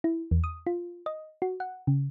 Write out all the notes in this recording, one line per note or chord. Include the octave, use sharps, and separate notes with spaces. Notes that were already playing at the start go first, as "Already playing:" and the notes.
E4
E2
D#6
F4
D#5
F#4
F#5
C#3